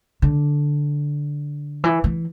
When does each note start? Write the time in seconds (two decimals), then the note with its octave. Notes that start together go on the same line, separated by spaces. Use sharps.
0.22 D3
1.84 E3
2.04 E3